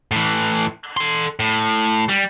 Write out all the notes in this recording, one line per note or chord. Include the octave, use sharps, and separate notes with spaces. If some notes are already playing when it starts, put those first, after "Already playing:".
A2 E3
A4 C6
A2
G3